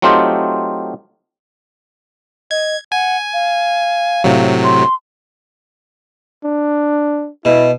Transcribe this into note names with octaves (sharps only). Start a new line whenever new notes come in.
F#3 A3 C4 D#4 F4 G4
D#5 G#6
F#5 G#5
F5
A2 C3 F#3
C6
D4
B2 E4